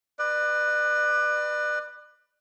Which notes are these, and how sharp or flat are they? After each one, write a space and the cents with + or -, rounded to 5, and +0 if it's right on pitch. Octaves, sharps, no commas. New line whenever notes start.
B4 +0 D5 +35